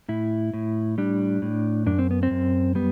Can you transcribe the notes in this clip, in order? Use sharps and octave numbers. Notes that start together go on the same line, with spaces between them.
A2 E4
A2
G3 D4
A2
F#2 D4
C4
B3
C4
F#2
G3 B3